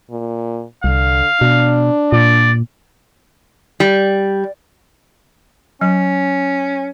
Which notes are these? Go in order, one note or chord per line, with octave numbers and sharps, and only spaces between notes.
A#2
C2 D3 F5
B2 D4
A#2 D5
G3
F#3 C#4